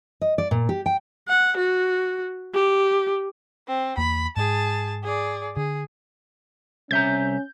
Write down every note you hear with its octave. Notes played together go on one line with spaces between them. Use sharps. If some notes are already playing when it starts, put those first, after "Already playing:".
D#5
D5
A#2
G4
G5
F#5
F#4
G4
C4
E2 A#3 B5
G#2 G#4 A5
G#4 D5
D3 G#4
C2 C#4 E5 A#5 G6